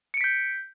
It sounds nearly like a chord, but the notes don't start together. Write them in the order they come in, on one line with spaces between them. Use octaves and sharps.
C#7 D7 B6 G6